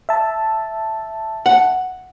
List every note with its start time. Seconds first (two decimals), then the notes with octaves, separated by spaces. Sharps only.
0.09 E5 A5
1.46 F#5